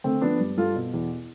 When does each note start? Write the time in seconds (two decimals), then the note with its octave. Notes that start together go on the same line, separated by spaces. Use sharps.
0.04 D3 A3 C4
0.22 F3 B3 D4
0.40 G2
0.57 G2 F4 A4
0.75 B2
0.94 E2